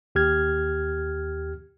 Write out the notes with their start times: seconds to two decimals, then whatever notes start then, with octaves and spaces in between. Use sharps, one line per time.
0.15 D#2 G4 F6 G#6